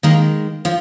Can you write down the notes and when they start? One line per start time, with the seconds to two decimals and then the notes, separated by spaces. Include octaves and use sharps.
0.03 D#3 G#3 A#3 A#4
0.65 F3 F4